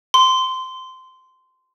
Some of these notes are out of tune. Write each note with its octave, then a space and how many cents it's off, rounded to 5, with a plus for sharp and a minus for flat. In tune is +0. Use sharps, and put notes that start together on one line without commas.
C6 -15